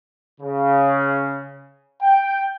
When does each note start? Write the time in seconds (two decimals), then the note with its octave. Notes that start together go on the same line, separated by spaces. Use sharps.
0.41 C#3
2.02 G5